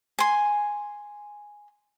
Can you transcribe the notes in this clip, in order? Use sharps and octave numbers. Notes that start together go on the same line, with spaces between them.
G#5 C6